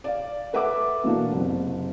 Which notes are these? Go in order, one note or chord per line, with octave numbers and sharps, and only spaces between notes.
D5 F5
A4 B4 E5 F#5 D6
B2 E3 A#3 D4 F#4
F#1 C3